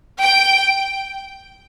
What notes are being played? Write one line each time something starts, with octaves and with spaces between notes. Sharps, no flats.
G5